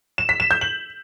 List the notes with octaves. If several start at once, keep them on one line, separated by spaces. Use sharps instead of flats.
E7
B6
E7
G6
F#7